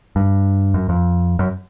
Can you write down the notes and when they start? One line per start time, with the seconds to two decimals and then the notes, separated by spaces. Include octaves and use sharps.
0.16 G2
0.74 F#2
0.89 F2
1.39 F#2